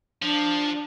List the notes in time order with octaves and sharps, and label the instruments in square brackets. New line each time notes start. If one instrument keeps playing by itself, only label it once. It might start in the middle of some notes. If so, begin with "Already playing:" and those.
[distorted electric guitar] F3 [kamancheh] D4